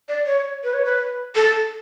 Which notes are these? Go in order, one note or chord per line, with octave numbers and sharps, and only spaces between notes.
D5
C#5
B4
C#5
B4
A4